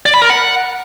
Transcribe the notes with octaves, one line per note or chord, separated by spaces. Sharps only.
D5
B5
A#4
F#5